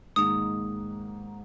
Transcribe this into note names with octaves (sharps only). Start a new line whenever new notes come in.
G#2 D#3 A#3 D#6